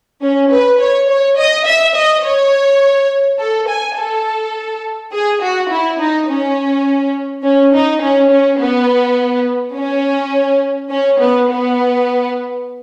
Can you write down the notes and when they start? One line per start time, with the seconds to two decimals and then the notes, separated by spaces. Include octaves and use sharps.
0.22 C#4
0.50 B4
0.79 C#5
1.08 C#5
1.37 D#5
1.66 E5
1.95 D#5
2.23 C#5
3.39 A4
3.68 G#5
3.97 A4
5.12 G#4
5.41 F#4
5.70 E4
5.99 D#4
6.28 C#4
7.43 C#4
7.73 D#4
8.01 C#4
8.30 C#4
8.59 B3
9.75 C#4
10.90 C#4
11.19 B3
11.48 B3